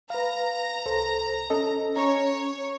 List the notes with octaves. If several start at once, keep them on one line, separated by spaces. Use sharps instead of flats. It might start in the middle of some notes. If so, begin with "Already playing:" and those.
B4 F5 A#5
C2 A4 C5
C#4 A4 D#5
C#4 C#5 A#5